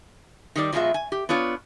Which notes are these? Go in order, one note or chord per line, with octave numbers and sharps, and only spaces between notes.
D#3 G3 D5
B2 F3 F#3 G#3 F4 E5
G#5
G4
B3 D4 F4 C#5